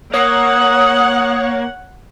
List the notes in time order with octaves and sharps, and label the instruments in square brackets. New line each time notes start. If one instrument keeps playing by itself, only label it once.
[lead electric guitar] A#3 [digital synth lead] C#5 [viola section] F#5 [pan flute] D#6